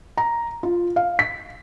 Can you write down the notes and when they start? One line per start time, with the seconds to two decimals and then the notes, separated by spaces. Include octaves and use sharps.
0.17 A#5
0.63 F4
0.96 F5
1.19 B6